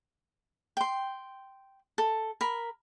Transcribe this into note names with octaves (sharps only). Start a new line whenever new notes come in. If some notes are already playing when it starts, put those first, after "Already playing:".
G5 C6
A4
A#4 B5